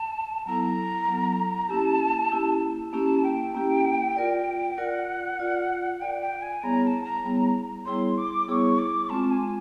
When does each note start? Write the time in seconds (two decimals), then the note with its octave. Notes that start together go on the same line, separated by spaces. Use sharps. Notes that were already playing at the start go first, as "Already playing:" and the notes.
Already playing: A5
0.46 F#3 B3 E4 A4 A#5
1.08 F#3 B3 E4 A4
1.69 A#3 C#4 E4 G4 A5
2.31 A#3 C#4 E4 G4
2.92 A#3 C#4 E4 G4 A5
3.24 G5
3.54 A#3 C#4 E4 G4
4.16 F4 A#4 D5
4.78 F4 A#4 D5 F#5
5.40 F4 A#4 D5
6.01 F4 A#4 D5 G5
6.21 G5
6.42 G#5
6.63 G3 B3 E4 G#4 C#5 A#5
6.84 A#5
6.87 A5
7.04 A#5
7.25 G3 B3 E4 G#4 C#5
7.86 G3 B3 E4 G#4 C#5 C6
8.18 D6
8.48 G3 B3 E4 G#4 C#5 C#6 D6
8.79 D6
9.10 G#3 C4 F4 A5
9.31 G#5